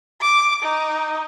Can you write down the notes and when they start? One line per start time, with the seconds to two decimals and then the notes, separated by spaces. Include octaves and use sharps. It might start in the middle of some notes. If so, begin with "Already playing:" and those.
0.22 D6
0.63 D#4